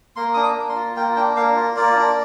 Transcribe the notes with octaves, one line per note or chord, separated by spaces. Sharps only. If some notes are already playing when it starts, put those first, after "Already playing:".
A#3 C6
D4 D#6
D6
A#3
C6
F4
A#3 G5
D4 G5
A#3 F5
F4
A#3 D5
D4